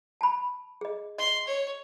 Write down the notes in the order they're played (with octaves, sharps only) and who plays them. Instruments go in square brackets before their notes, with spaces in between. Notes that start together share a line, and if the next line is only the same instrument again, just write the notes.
[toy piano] A5 B5
G#4 D#5
[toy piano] D#5 [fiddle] C6
[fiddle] C#5